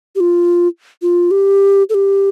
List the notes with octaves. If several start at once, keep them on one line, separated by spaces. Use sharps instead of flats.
G4
F4
F4
G4
A4
G4